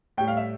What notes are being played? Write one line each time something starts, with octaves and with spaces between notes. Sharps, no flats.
A2 G3 G5
F5
E5